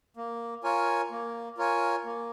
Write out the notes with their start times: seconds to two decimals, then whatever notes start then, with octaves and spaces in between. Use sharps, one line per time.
0.17 A#3
0.64 F4 A#4 C#5 G#5
1.11 A#3
1.58 F4 A#4 C#5 G#5
2.05 A#3